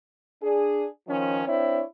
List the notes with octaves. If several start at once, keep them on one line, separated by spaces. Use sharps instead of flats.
D4 G#4
D#3 F3 C#4
C4 D4 E4 C#5